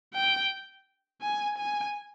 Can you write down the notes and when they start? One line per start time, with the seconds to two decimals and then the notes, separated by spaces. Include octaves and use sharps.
0.14 G5
1.22 G#5
1.58 G#5